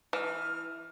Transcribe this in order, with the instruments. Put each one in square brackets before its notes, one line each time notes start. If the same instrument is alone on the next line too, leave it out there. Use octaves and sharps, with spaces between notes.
[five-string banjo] E3 [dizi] F6